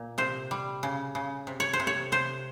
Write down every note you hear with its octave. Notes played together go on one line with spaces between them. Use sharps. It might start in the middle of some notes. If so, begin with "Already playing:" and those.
Already playing: A#2
C3 C5
G3
C#3
C#3
C3
C#5
C5
C3
C#5
C3 C5